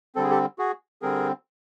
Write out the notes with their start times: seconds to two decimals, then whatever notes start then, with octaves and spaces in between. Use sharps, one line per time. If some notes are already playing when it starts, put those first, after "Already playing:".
0.15 D3 G3 C4 A4
0.23 G#4
0.30 G4 A4
0.58 F#4 G#4
1.02 D3 G3 C4 G#4 A#4